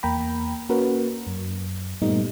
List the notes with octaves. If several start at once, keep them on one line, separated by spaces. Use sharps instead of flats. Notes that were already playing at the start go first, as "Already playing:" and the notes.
E2 A#3 G5 A#5 B5
A#3 C#4 F#4 A#4 B4
F#2
G2 A#2 G3 A3 B3 D#4